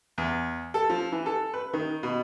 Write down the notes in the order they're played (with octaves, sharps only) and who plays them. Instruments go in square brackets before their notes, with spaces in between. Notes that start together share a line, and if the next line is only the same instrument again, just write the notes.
[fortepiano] E2
A4
F3
E3
A4
B4
D#3
B2